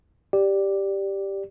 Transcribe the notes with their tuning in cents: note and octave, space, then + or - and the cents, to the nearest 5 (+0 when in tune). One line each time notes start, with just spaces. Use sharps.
G4 +0 D5 +0